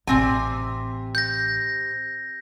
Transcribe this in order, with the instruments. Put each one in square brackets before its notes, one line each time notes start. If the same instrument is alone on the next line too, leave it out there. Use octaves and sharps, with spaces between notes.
[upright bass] A1 [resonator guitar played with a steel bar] C3 C4 G#5
[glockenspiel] G6 A#6